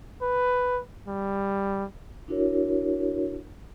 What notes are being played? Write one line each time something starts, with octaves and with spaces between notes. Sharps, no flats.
B4
G3
D4 E4 F#4 A#4 C#5